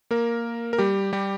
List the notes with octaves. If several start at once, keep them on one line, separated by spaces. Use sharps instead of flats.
A#3 A#4
A#4
G3 G4
G3 G4